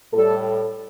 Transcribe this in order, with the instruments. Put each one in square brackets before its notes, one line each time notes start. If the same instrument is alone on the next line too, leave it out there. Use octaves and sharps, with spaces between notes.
[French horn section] A2 G3 A4